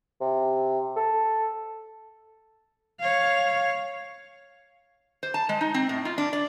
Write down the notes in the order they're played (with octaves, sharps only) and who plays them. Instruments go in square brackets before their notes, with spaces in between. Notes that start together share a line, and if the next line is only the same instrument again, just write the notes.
[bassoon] C3
A4
[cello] C#5 F5
[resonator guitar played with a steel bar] C5
A5
G#3
D#4
C4
A2
F4
D4
D5